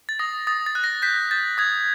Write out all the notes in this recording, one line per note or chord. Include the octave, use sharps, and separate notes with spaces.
A6
D#6 A#6
D#6 A6
A6
F#6
A#6
G6 B6
G6 A6
D#6 G#6